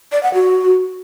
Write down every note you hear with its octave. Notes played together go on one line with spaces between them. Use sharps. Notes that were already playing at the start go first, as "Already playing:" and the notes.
D5
F#5
F#4